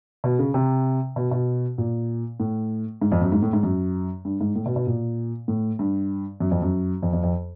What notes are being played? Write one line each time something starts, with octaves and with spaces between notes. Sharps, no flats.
B2
C#3
C3
B2
B2
A#2
A2
G#2
F2
F#2
G#2
A2
G#2
F#2
G2
G#2
A2
B2
B2
A#2
A2
G2
F#2
F2
F#2
F2
F2
F2